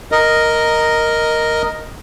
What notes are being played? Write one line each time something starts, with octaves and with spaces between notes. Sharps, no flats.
A#4 D#5